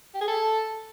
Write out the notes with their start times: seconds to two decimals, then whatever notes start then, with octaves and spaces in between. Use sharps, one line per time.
0.15 G4
0.21 G#4
0.28 A4